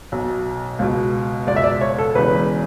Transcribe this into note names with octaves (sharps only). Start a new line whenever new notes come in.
B1 B2
C#2 B2
C#2 B2 D5
E5
D5
C#5
A4
E1 E2 C#3 E3 B4